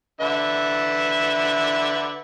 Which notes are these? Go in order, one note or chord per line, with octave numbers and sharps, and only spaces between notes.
D3 B4 E5